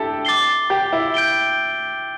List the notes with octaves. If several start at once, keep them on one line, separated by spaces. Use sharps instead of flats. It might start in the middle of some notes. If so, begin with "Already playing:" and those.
Already playing: D4 E4 G4 A4
D6 A6 C7 G7
G4
E4
G6 D7 G7